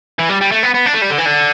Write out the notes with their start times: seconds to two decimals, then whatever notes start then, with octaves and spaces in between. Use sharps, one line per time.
0.19 E3
0.29 G3
0.41 G3
0.52 A3
0.63 B3
0.74 B3
0.86 D4
0.94 A3
1.02 G3
1.10 D3
1.18 E3
1.26 D3